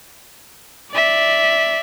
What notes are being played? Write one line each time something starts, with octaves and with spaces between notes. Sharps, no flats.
D5 E5